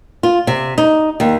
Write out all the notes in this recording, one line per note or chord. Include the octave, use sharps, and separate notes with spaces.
F4
C3
D#4
D#2